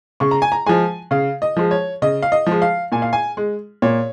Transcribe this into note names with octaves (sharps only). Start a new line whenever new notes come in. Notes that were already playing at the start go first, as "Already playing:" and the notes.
C#3 C#6
A#5
G#5
A#5
F3 G#3 G#5
C#3 F5
D#5
F3 G#3
C#5
C#3 D#5
F5
D#5
F3 G#3
F5
A#2 G#5
F5
G#5
G#3
A#2 C#5